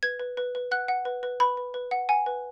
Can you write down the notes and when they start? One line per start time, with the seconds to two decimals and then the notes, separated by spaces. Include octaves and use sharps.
0.03 B4 G#6
0.20 B4
0.37 B4
0.55 B4
0.71 F#5 F#6
0.88 F#5
1.05 B4
1.23 B4
1.40 B4 B5
1.57 B4
1.74 B4
1.91 F#5
2.09 F#5 G#5
2.26 B4